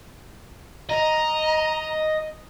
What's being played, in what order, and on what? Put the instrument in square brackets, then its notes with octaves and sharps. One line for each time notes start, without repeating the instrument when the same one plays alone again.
[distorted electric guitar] D#5 [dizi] A#5